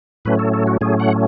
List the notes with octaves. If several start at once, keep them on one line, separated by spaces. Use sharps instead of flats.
A2 F#3 A3 C#4 B4
A4
A4
F#4
A2 F#3 A3 C#4 G#4
F#5